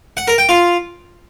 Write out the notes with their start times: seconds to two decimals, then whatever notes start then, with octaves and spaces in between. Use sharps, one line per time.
0.17 F#5
0.28 A#4
0.38 G5
0.49 F4